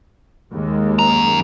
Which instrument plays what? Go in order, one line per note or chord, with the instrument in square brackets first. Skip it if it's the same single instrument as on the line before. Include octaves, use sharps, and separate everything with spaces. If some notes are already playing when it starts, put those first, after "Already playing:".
[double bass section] D#2 G#3
[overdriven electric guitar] F#2 A#5